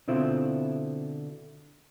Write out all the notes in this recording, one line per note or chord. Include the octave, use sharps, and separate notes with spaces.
B2 D3 C4 E4 F4